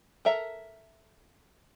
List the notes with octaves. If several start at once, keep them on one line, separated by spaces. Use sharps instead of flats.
A4 A#4 E5 A#5